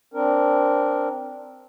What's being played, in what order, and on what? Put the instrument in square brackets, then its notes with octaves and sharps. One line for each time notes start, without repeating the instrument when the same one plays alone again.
[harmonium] C4 D4 A#4